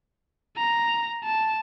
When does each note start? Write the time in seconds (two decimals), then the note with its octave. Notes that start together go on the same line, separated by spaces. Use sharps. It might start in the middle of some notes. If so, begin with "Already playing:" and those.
0.56 A#5
1.24 A5